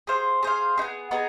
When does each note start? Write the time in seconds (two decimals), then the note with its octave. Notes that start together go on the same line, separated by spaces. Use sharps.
0.07 G#4 C5 F5
0.43 G#4 C5 F5
0.77 D#4 G#4
0.82 B3
1.11 B3 D#4 G#4